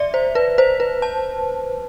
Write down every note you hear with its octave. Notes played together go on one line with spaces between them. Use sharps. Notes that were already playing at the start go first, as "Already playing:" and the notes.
Already playing: D5 E5
C5
B4
C5
B4
A5